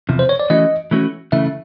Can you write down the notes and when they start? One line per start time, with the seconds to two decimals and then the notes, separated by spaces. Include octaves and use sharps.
0.09 E2 C3 F3
0.19 C5
0.29 C#5
0.40 D5
0.50 E3 A3 C#4 F#4 D#5
0.91 E3 A3 C#4 F#4
1.32 C#3 E3 A3 E5